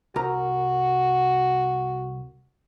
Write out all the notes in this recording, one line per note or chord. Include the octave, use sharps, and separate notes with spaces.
C2 F#4 A#4 A#5